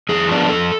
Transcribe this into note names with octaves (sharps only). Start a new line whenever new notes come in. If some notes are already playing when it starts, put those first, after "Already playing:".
F2 G#4
F3 B3 D4
F2 A4